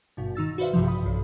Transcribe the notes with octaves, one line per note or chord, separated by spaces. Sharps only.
G#1 G2 B2
D#3 D#4 E6 A6
F#4 B4 C5 D5 E5 F5
A#1 G2 C3 E3 F3
B5 D#6
B1 G2